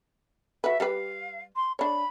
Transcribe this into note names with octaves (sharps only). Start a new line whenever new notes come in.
F#4 B4 E5
G3 G4 B4 F5
C6
D4 C#5 B5